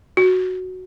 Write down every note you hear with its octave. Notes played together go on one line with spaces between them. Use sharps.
F#4